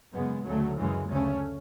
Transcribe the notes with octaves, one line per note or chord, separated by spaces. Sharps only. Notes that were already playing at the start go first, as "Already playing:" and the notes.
F#2 C#3 G#3 B3
D2 C#3 F#3 A3
F#2 C#3 E3 G#3
D2 C#3 A3 C#4